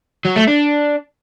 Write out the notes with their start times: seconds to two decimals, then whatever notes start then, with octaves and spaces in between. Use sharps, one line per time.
0.25 F#3
0.36 A3
0.47 D4